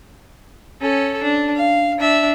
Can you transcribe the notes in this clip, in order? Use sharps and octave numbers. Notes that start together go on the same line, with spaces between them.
C#4 A4
D4
F5
D4 E5